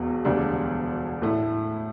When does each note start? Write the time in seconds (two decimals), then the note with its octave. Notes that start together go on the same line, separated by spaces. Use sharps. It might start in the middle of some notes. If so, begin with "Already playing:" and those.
Already playing: E1 E2 B2
0.25 E1 D2 D3 G3 D4
1.22 A2 A3 E4